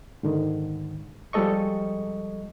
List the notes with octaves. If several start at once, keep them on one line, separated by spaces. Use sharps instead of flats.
G#2 D3 D#3
F3 G3 G#3 A4 D#5 C#6